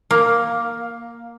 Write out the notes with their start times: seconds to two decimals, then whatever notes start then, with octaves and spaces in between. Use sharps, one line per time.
0.11 A#3